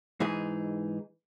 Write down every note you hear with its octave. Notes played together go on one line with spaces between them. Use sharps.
G#2 E3 D#4 G#4